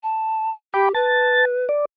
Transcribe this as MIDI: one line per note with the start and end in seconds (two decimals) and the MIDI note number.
0.03 0.50 81
0.74 0.94 67
0.74 0.89 79
0.74 0.89 83
0.74 0.89 86
0.94 1.66 71
0.94 1.45 81
0.94 1.45 93
1.69 1.85 74